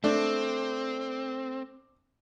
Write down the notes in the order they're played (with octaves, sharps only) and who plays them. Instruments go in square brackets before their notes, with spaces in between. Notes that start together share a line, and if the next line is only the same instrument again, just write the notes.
[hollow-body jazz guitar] A3 [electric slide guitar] C4 [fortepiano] D4